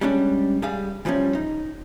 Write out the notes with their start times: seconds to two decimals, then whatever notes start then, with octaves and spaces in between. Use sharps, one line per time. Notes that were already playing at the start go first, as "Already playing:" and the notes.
0.01 G3 G#3 C#4 D4
0.62 G3 G#4 F5
1.05 E3 F3 G3 A3 C#4
1.35 D#4